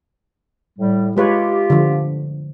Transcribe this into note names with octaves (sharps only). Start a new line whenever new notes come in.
A2 G3
G#3 F4 G4 B4 C#5
D3 F3